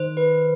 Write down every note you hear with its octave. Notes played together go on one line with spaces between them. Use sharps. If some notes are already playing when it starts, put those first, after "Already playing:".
Already playing: D#3 C5
B4